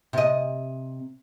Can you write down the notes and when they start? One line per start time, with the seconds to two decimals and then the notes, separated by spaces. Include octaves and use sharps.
0.13 C3 D#5